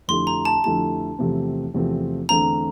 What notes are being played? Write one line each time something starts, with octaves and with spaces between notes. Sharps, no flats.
F2 D3 A3 E4 G4 C6
A#5
A5
F2 D3 A3 E4 G4 A5
E2 C3 F3 A3 C4
E2 C3 F3 A3 C4
E2 D3 A3 C4 A#5